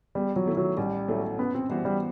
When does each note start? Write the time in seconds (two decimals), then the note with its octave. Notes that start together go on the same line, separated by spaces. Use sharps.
0.15 E2 G3
0.36 F#3
0.46 D#3 A3 E4
0.57 F#3
0.77 A1 G3
1.08 A2 F#3 A3 E4
1.39 F#2 B3
1.54 C4
1.69 E3 G3 B3 F#4 C5
1.85 G3